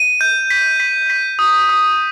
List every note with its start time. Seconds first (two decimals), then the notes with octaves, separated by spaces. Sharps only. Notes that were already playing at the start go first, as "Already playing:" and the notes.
Already playing: D#7
0.21 G6
0.50 B6
0.80 B6
1.10 B6
1.39 D#6
1.69 D#6